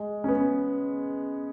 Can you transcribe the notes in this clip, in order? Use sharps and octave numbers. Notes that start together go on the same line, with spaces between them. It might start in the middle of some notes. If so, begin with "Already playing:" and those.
Already playing: G#3
C#4
B3